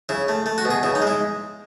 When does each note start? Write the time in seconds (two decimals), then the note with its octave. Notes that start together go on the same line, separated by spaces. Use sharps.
0.09 C#3 E4
0.28 A3
0.46 A3
0.58 F#4
0.65 B2
0.71 G#4
0.83 C#3 E4
0.95 D#4
1.02 G#3
1.07 E4